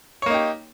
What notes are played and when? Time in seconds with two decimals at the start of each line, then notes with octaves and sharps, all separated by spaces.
0.22 C#5
0.26 A#3
0.30 D#4
0.34 G4